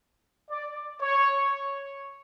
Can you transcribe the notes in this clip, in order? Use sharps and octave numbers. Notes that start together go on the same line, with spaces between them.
D5
C#5